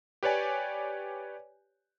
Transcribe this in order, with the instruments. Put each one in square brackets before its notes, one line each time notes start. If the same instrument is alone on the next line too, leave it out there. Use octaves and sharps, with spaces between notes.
[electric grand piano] G4 B4 C#5 D5 G#5